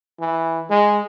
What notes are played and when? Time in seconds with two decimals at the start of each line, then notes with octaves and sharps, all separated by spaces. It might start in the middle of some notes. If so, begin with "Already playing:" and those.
0.20 E3
0.70 G#3